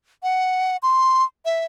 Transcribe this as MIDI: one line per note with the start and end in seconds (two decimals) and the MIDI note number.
0.23 0.77 78
0.83 1.24 84
1.45 1.65 76